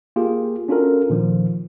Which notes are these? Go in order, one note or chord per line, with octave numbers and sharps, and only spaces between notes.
A#3 F4 G4 G#4
C#4 D4 F4 F#4 A4 A#4
A#2 D#3 F3